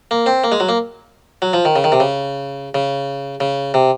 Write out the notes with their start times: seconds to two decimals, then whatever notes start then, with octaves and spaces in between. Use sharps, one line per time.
0.11 A#3
0.26 C4
0.44 A#3
0.52 G#3
0.60 F#3
0.69 A#3
1.42 F#3
1.53 F3
1.65 D#3
1.76 C#3
1.84 D#3
1.92 C3
2.00 C#3
2.75 C#3
3.40 C#3
3.74 C3